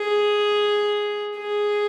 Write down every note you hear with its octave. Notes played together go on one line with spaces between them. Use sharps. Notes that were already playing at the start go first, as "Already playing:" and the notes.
Already playing: G#4
G#4